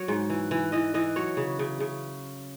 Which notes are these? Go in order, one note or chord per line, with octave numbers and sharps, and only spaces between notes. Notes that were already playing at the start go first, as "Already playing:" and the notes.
Already playing: F#3 C#5
G#2
E3
E3
E3 D#5
E3 D#5
F#3 C#5
C#3
C#3
C#3